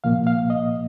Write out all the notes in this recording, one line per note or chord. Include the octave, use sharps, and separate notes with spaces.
C2 A#2 F3 A#3 F5
F5
D#5